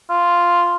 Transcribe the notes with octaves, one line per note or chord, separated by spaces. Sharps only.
F4